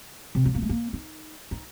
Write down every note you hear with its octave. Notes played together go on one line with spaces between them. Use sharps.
C3
F#3
A#3
A3
A#3
D#4
D#4